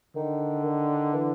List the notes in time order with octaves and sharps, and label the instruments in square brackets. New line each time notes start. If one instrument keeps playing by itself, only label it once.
[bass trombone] D3 [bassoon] D#3
[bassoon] D#3
E3